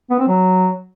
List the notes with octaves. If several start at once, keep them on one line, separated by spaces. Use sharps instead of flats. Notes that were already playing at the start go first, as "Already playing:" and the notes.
B3
C4
F#3